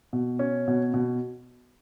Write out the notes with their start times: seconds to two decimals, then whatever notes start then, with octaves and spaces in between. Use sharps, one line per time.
0.13 B2
0.39 C#4
0.68 B2
0.94 B2